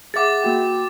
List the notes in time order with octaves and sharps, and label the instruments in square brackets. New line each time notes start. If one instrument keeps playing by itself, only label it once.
[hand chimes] G#4 E5 F#5 [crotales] D6 A6
[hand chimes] A#3 F#4 G5